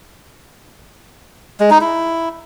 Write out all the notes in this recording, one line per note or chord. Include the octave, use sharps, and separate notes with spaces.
G#3
D#4
E4